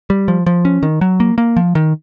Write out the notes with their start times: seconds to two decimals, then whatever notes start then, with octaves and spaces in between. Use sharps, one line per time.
0.10 G3
0.28 F3
0.46 F3
0.65 C#4
0.83 D#3
1.01 F#3
1.20 A#3
1.38 A#3
1.57 F3
1.75 D#3